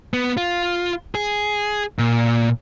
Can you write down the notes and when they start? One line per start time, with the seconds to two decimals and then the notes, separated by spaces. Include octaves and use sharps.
0.14 B3
0.37 F4
1.15 G#4
1.99 A#2